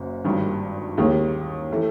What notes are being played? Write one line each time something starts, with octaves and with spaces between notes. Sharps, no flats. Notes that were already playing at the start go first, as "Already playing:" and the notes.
Already playing: F#1 F#2
G#1 G2 D#3
D#2 D#3 G#3
E3 A3